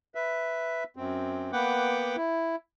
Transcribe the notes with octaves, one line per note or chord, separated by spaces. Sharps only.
B4 E5
F#2 C4
A#3 B3 B4 F#5 G5 D6
E4